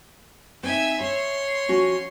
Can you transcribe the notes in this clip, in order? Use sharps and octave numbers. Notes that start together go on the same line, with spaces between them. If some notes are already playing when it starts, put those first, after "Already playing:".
C4 D#4 E5 G#5
C#5 E5 C6
F3 C#4 F#4